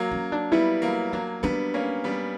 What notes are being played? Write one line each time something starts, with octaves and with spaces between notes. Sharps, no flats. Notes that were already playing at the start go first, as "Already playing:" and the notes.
Already playing: F#3 A#3
C#4
D4
G3 B3 E4
F#3 A#3
F#3 A#3 D4
G3 B3 D4
A#3 C#4
G3 B3